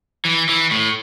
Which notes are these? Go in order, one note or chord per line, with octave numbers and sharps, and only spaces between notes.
E3
E3
A2